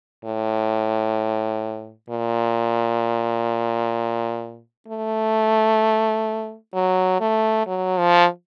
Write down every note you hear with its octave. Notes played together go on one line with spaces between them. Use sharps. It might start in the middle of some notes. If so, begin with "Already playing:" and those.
A2
A#2
A3
F#3
A3
F#3
F3